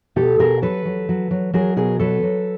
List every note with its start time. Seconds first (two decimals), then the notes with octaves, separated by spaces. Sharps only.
0.16 B2 G4 A4
0.39 B2 G#4 A#4
0.62 F#3 A4 B4
0.85 F#3
1.09 F#3
1.31 F#3
1.54 F#3 G#4 A#4
1.76 B2 G#4 A#4
1.99 F#3 A4 B4
2.23 F#3